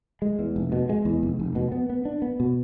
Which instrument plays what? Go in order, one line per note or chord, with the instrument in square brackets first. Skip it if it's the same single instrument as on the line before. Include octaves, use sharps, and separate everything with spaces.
[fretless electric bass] G#3
E2
F1
B2
G#3
E2
F1
F1
B2
B3
B3
D4
B3
B2